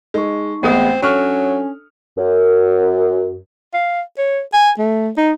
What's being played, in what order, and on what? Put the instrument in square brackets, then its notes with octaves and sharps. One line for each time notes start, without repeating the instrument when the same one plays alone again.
[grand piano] G#3 [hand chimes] D#4 C#6
[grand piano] A1 G#3 D#6 [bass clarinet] B3 [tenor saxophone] C4 [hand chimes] G5
[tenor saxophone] F#3 [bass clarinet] C#4 [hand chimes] D4 A4 [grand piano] C#6 F6
[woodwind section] F#2
[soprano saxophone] F5
C#5
G#5
A3
D#4